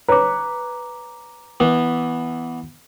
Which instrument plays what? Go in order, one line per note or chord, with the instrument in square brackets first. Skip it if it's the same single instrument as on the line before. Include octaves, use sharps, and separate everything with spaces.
[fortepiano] B4 C#5 [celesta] A#5 D6
[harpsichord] E3 B3